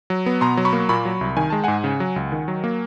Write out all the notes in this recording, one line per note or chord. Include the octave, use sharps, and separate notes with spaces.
F#3
B3
B2 A#5 C6
F#3
B5 C#6
A#3
A#2 B5 C#6
F#3
C2
D#3 G#5
G#3 A5
G#2 F#5 G#5
C#3
F#3
C#2
D#3
F#3
A#3